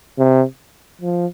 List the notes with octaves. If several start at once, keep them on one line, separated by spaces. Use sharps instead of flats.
C3
F3